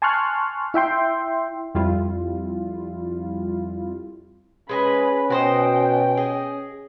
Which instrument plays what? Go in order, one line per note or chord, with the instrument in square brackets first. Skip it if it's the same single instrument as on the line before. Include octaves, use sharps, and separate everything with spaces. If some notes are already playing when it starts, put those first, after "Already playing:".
[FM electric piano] G#5 A5 C6 C#6 F6 F#6
E4 E5 G5 C6
[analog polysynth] F2 G3 E4 F4
[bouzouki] G#3 D#5 G#5 [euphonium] C#4 [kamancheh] B4 B5
[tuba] B2 [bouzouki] F#4 C5 D#5 [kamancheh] G5
[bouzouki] G#4 D#5